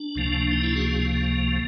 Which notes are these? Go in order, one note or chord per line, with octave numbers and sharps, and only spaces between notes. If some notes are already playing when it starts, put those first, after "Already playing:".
Already playing: D4
C#2 C3 F3 A#3
D#4
D4 E4
F#4 G#4